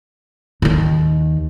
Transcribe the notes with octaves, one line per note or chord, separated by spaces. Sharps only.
D#2 D#3